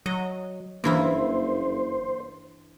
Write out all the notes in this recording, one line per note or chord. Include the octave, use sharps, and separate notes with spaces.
F#3 D#5
F#1 G2 E3 A#3 E4 C5